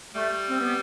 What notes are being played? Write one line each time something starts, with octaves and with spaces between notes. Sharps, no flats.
G3 A3
C4
B3